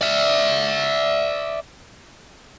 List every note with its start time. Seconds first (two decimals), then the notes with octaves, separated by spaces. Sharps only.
0.01 D5 E5